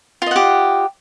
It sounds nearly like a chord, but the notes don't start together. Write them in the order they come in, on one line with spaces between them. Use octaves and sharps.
F4 D#5 F#5 G4